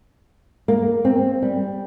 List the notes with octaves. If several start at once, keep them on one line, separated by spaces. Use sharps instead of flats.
A#3
C4
G3